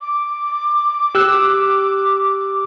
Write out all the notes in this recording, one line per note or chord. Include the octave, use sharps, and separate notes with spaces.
D6
G4 E6 F#6